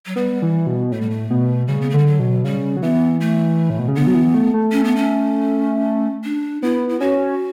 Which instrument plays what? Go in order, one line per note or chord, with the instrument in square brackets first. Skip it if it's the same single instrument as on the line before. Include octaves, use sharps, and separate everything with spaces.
[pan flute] F#3
[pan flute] G3 [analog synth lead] B3
[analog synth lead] E3
B2
[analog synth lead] A2 [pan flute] A3
[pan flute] G3
A3
[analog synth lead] B2
[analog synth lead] C#3 [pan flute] G3
[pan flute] B3
A3
[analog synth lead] D3 [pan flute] G3
[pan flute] F#3
[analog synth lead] B2
[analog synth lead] C#3 [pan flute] G3
[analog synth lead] F#3
[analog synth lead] E3 [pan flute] B3
[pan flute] A3
[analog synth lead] A2
B2
C#3
[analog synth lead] D3 [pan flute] B3
[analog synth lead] F#3
E3
A3
A3
[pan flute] C#4
B3
C#4
D4
[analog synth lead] B3 [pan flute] E4
[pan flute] E4
[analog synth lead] C#4 [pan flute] F#4